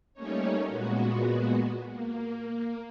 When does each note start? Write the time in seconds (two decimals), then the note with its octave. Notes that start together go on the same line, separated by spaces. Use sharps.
0.14 G3 A3 A#3 C#4 D#4 C#5
0.66 A#2 G#3 B3 F#4
1.92 A#3